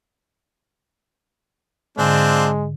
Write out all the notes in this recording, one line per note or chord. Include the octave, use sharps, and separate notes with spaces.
G#2 D3 G#3 C4 D4 F4 G#5